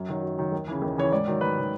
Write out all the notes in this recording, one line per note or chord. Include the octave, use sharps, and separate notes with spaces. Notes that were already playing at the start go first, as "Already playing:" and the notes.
Already playing: F#2
D#3 F#3
F#2
D#3 F#3
D#2
C#3 E3
D#2
C#3 E3 C#5
G#2 D5
D#3 F#3
G#2 B4
D#3 F#3